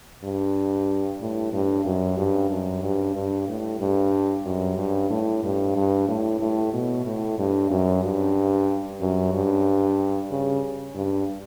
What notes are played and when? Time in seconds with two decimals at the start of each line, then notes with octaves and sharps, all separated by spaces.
0.24 G2
1.21 A2
1.53 G2
1.85 F#2
2.18 G2
2.50 F#2
2.83 G2
3.16 G2
3.48 A2
3.80 G2
4.45 F#2
4.78 G2
5.10 A2
5.44 G2
5.76 G2
6.08 A2
6.41 A2
6.73 B2
7.05 A2
7.38 G2
7.71 F#2
8.04 G2
9.00 F#2
9.33 G2
10.31 C#3
10.95 G2